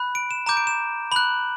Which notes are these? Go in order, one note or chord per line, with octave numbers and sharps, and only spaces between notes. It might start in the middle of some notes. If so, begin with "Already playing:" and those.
Already playing: B5 F#6
D7
E7
A#5 D6 G6 E7
D7
E7
B5 F#6 F#7